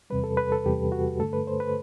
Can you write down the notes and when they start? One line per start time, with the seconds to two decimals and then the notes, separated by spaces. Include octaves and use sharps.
0.10 E2 C3 G3 B4
0.24 A4
0.37 B4
0.52 A4
0.65 E2 C3 G3 G4
0.92 F#4
1.19 G2 D3 A3 A4
1.33 B4
1.47 C5
1.60 B4